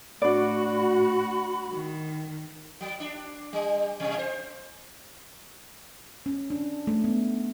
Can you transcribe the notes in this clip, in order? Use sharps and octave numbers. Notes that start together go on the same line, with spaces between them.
A2 D4 F#4 D5 B5
D#3
F#3
D4
G3
B2 G3
C5
C#4
D4
A3
B3